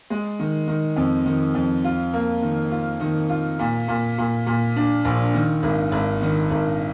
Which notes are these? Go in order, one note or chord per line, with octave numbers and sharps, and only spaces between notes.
G#3
D#3
D#3
F2
D#3
F2
F4
A#3
D#3
F4
D#3
F4
A#2
A#2
A#2
A#2
D4
A#1
D#3
G#1
G#1
D#3
G#1